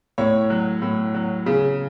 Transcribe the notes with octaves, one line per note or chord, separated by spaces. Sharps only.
A2 C#5
F#3
A2
F#3
C#3